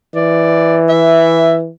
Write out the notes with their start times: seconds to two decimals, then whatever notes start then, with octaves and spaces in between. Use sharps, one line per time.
0.15 E3 D5
0.89 E5